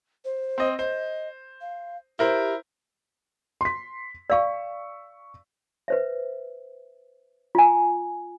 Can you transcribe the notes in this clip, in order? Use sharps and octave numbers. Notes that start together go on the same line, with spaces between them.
C5
C4 D#5
C5 D#5
F5
E4 G4 A#4 C5
C6 B6
D5 F5 C#6 E6
B4 C5 E5
F4 G#5